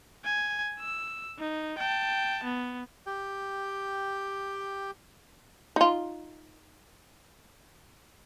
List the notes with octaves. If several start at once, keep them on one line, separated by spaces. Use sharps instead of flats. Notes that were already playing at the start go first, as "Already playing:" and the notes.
G#5
E6
D#4
G5 A5
B3
G4 G5
D#4 F4